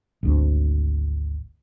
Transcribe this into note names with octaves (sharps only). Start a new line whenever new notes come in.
G#1 D2